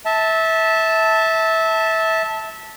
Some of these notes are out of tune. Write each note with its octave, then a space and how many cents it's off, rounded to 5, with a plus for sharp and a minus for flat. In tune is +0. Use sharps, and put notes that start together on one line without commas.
E5 -20 A5 +0